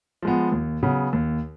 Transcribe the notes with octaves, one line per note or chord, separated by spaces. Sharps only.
F3 G#3 B3
D#2
C#3 F#3 B3
D#2